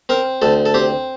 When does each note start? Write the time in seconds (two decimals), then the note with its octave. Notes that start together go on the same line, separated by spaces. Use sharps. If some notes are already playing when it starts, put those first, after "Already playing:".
0.09 C4 A#4
0.42 D2 A4
0.66 A4
0.74 C4 G4